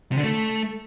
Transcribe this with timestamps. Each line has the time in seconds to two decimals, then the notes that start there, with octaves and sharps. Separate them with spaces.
0.12 C3
0.18 D3
0.23 A3